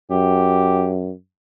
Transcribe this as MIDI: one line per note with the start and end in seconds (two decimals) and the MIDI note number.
0.10 1.11 42
0.10 0.95 67